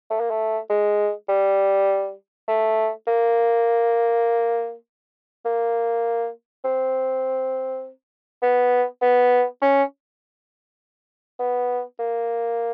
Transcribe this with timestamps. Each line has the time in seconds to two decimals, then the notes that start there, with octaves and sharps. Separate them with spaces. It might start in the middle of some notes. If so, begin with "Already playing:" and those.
0.10 A3
0.20 A#3
0.30 A3
0.70 G#3
1.29 G3
2.48 A3
3.07 A#3
5.45 A#3
6.64 C4
8.42 B3
9.02 B3
9.62 C#4
11.39 B3
11.99 A#3